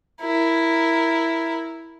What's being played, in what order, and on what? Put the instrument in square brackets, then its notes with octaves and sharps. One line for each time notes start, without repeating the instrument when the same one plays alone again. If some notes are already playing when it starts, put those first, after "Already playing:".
[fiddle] E4 A#4